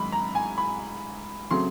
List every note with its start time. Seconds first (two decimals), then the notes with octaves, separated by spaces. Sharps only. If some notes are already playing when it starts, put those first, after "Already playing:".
Already playing: G#2 D#3 F#3 B5
0.12 A#5
0.35 G#5
0.58 B5
1.51 C#3 F#3 A3 C4 C6